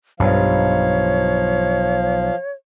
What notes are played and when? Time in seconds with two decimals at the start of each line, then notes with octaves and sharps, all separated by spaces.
0.20 B1 G2 F3 C#5 F5